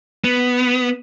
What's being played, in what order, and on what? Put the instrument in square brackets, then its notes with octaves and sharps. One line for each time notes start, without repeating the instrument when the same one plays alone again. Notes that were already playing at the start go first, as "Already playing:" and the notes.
[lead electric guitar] B3